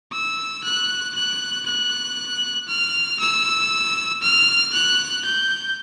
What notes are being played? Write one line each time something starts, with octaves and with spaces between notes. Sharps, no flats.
E6
F#6
F#6
F#6
F6
E6
F6
F#6
G6